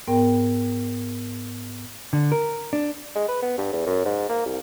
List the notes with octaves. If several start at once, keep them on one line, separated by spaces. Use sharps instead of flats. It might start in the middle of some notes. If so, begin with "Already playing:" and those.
G#2 B3 A#4 G5
D3
A#4
D4
G#3
B4
B3
G2
E2
F#2
G#2
A#3
C2